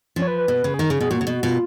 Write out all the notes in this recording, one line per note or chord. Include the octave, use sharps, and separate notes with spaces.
F3 C#4
C#5
B4
B4
B2
C#3
G#4
D#3 A#4
C#3 G#4
B2 G#4
A#2 F#4
C#3
B2
B2 F4